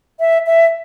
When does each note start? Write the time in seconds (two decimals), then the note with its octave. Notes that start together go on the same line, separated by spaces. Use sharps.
0.20 E5
0.47 E5